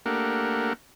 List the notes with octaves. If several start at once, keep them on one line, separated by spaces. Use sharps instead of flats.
A3 A#3 D4 G4 A#4 F#5